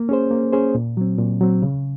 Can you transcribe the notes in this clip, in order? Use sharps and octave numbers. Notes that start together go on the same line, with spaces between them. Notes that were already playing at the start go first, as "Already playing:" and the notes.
Already playing: A#3
C#4 G#4 C5
A#3
C#4 G#4 C5
A#2
F#3 C4
A#2
F#3 C4
C#3